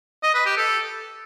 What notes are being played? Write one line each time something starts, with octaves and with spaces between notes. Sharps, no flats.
D#5
B4
G4
A4